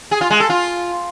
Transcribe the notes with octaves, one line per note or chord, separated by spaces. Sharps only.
G#4
F4
G#3
A4
F4